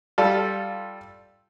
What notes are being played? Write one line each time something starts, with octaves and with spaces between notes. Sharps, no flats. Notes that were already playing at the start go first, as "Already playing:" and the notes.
G3 F4 A4